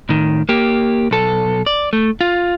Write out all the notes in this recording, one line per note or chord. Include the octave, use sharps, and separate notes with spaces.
A2 D#3
A#3 G4
B1 A4
D5
A3
F4